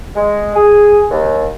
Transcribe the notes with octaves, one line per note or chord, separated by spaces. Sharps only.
G#3
G#4
D#2